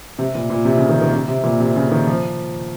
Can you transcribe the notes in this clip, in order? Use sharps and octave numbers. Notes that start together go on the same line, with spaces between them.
C3
A#2
A#2
C3
C#3
D#3
D#3
C3
C3
A#2
C3
C#3
D#3
F3